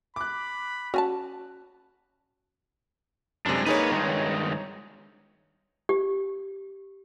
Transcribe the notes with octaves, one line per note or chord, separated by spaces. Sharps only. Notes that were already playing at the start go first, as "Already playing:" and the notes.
B5 D6 F#6
C#4 F#4 G#5 A5
F#2 C3 G#3 D4
A#3 D#4 G#4 B4 C#5
G2 D#3 G#3
G4